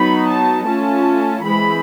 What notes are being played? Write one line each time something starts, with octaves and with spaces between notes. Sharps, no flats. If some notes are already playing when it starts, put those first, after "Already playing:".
Already playing: F#3 B3 D#4 B5
A5
A3 C#4 F4 A5
E3 G#3 C4 B5